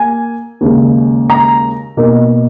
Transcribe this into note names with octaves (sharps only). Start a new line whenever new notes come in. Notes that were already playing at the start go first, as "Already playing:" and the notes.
Already playing: A#3 G#5
D#2 C#3 G#3
A#5
B2 A#3 D#4